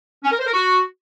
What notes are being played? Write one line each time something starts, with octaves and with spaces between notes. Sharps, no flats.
C#4
A#4
C5
A#4
F#4